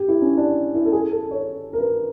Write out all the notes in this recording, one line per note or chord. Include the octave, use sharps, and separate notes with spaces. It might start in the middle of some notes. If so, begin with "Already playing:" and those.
Already playing: G4
E4
C#4
D4
E4
A4
G#4
A4
C#5
A#4
B4